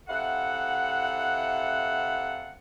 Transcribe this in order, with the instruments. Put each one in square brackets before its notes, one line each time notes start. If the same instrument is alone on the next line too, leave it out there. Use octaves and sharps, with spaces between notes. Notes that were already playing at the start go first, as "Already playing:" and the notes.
[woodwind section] C3 E4 A4 F5 F#5